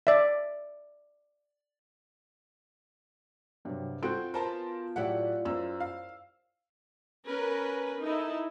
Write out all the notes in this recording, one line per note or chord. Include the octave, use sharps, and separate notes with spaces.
D5 E5
G2 C3 F#3
C4 F4 F#4 A4 C6 G6 D7
B3 C#4 F#4 A#4 C5 A5
A2 F#3 E4 G4 D5 F#5
F#2 C5 E6
F5
C#4 A#4 B4
D#4 E4 A4